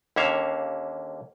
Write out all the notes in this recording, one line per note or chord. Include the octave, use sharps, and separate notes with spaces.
D#2 D3 A#3 C#4 E5 F5